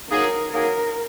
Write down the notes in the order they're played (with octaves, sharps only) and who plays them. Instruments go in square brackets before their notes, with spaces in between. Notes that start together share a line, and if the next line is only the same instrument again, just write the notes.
[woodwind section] F#3 A#3 D#4 G#4 [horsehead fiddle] A#4
[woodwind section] F#3 A#3 D#4 G#4 [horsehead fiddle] A#4